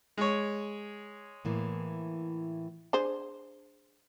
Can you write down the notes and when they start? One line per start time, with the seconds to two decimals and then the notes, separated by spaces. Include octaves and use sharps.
0.17 G#3 C#5
1.45 A2 E3 A#3
2.93 D4 G#4 C5